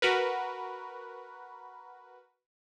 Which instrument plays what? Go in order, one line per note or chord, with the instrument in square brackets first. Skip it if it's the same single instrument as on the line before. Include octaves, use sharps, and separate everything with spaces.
[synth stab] F#4 A#4 B4